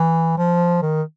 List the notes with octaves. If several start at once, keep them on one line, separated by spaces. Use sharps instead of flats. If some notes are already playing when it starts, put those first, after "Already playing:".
Already playing: E3
F3
D#3